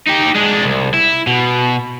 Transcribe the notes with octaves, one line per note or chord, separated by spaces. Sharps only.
D#4 G4
G#3 D4
C2
E4
B2